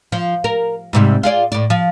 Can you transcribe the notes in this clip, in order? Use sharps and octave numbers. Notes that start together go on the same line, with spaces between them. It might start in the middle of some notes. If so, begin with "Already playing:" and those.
F3
A#4
G#2 C3 G3
F4 G#4 D5
A2 D5
F3